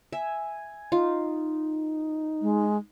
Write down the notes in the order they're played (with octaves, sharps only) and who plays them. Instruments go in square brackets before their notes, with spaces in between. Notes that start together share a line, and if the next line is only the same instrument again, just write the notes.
[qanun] E5 [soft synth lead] G#5
[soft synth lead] D#4 [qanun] F4
[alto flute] G#3